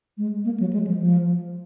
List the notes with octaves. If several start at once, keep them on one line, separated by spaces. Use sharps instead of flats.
G#3
A#3
F#3
G#3
F3
F3